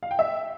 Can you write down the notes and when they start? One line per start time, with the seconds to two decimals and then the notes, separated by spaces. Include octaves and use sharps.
0.03 F5
0.11 G5
0.19 E5